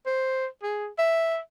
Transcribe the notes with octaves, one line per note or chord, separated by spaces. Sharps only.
C5
G#4
E5